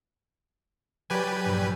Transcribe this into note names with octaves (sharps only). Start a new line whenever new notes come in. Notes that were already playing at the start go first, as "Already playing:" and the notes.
F#3 G4 B4 D5 G#5
A#1 G2